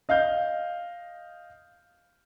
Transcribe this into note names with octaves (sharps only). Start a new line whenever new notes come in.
D#5 F5 F6 G6